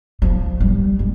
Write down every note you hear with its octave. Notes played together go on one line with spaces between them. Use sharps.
F3
G3
G#3